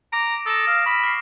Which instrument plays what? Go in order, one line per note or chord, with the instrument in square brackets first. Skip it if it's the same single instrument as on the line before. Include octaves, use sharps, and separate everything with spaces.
[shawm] A#5 [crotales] D6 D7
[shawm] A4 [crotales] D#6 A#6 E7
[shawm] F5
[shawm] B5 [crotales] C#6
[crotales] F6 C7